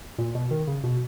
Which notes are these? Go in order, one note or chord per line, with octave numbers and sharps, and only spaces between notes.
A#2
B2
D#3
C#3
B2